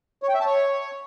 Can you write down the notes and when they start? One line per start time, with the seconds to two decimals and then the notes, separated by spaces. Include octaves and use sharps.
0.23 C#5
0.29 G5
0.34 E5
0.40 A5
0.46 C#5